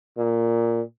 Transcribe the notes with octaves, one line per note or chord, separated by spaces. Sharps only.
A#2